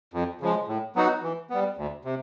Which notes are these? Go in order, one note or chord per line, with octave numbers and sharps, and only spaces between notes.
F2
C#3 F3 G#3
A2
F#3 B3 D#4 F#4
E3
G3 B3
D2
C3